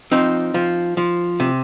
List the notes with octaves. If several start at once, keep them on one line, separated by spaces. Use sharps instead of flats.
F3 C4 D#4
F3
F3
C3